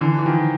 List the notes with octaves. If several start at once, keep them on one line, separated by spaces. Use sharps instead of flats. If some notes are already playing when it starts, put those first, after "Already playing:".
D3 E3
E3
D#3 F3